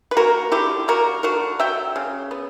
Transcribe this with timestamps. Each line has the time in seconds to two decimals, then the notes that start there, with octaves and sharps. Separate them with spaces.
0.11 B4
0.17 A#3 F#4 A#4
0.52 D3 E4 G4
0.88 A#3 F#4 A#4
1.23 D3 F#4 A#4
1.59 F#3 E5 G5
1.96 C#3
2.31 B3